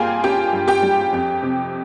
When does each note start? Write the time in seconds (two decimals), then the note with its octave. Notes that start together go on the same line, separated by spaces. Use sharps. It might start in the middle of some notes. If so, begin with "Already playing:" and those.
Already playing: G2 G3 A#3 F4 G#4 F5 G5 G#5
0.23 C#4 G4 G5
0.53 G2
0.68 G4 G5
0.82 G3
1.12 F2
1.43 C3